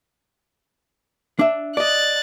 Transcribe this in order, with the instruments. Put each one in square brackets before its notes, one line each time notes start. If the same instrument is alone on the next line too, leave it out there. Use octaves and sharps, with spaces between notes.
[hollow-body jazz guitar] D4 E5
[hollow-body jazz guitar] D5 D#5 [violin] F#6 A6